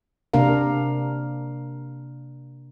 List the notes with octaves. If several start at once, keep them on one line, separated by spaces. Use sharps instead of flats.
C3 A#3 D4 A#4 F5